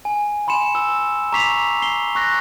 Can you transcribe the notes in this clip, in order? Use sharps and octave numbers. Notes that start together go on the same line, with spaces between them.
G#5
G#5 B5 C6 C#7 E7
B5 E6
A#5 C#6 D6 B6 C7 F7
C7 G7
C#6 F#6 A#6